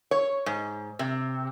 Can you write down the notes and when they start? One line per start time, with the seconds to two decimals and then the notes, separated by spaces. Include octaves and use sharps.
0.11 C#5
0.46 G#2
0.99 C3